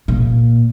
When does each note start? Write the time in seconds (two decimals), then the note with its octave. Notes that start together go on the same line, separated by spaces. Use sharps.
0.08 A#2